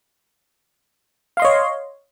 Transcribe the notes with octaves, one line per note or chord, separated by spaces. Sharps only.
C#5 D#5 F5 C6